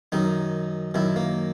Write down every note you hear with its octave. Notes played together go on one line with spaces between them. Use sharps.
F#2 D#3 D#4
F#2 D#3 E4
A#3